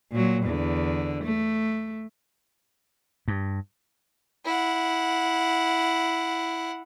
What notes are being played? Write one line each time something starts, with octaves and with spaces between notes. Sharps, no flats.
A#2 F#3
E2 D3
A3
G2
E4 F#5